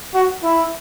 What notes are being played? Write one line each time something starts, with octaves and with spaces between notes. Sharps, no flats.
F#4
E4